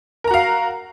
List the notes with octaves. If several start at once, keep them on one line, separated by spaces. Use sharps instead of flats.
F#4 A#4 F5 A#5